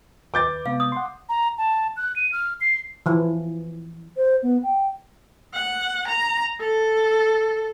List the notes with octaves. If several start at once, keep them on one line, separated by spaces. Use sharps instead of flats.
D#2 B4 D6 G6 A6
C3 G#3 B3 F5
D#6
F#5 C6
A#5
A5
F#6
D#7
F6
C7
E3 F3
C5
B3
G5
F#5
A#5
A4